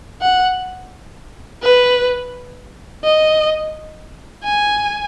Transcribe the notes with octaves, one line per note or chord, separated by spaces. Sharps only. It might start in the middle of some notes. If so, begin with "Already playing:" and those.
F#5
B4
D#5
G#5